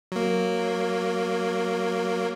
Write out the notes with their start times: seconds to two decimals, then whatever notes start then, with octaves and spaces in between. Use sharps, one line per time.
0.12 F#3 A#3